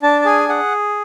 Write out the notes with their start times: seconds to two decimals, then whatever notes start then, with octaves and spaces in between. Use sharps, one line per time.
0.03 D4 A5
0.22 A5
0.25 G#4 G#5
0.49 G#4 F#5